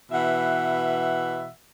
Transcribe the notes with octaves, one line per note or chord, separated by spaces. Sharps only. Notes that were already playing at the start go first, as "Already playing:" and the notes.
B2 E3 E5 F#5